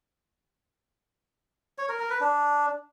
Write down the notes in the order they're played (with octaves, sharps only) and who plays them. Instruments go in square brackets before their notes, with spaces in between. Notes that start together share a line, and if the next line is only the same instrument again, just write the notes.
[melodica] C#5
A#4
A#4
B4
D4